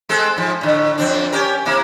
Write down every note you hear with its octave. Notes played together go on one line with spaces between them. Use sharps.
G#3 C4 A4
G#2 F3
A2 D3
F2 C4 D4
C#4 G4 A#4
C3 A#3 E4